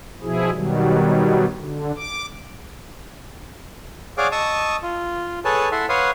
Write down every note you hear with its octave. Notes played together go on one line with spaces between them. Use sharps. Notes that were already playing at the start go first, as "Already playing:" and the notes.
B2 F3 E4 G#4
B2 D#3 F#3 G3
D3
D6
G#4 C#5 D5 F5 F#5 D6
D#5 A5 C#6 D#6 E6
F4
G#4 A4 B4 C#5 G#5 A5
E4 A4 E5 F#5 C6
B4 C#5 F5 F#5 C6 D#6